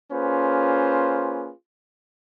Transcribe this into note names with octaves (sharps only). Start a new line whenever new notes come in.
A#3 C#4 F4 G#4 B4 C5